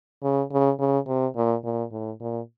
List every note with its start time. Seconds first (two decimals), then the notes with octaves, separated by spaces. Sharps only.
0.23 C#3
0.51 C#3
0.79 C#3
1.07 C3
1.36 A#2
1.64 A#2
1.91 A2
2.20 A#2